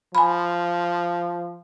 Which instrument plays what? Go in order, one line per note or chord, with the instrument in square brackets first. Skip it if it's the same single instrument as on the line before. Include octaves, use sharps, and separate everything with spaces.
[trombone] F3 [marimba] G#5 B5